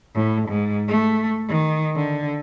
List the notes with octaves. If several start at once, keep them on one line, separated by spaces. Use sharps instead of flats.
A2
G#2
A3
D#3
D3